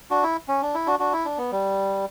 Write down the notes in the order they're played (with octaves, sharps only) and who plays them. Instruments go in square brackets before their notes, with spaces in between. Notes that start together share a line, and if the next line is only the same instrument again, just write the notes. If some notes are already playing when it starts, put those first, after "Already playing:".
[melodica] D4 F#4
E4
C#4
D4
E4
D4 F#4
D4 F#4
E4
D4
B3
G3